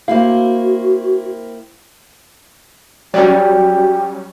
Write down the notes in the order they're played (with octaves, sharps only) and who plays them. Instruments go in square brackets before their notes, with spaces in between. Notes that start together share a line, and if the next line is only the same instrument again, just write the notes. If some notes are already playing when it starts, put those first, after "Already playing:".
[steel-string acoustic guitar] A#3 C4 E4 [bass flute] F#4 [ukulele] F5
[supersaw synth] F#3 G3 C#4 [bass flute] F#4 [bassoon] G4 [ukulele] D5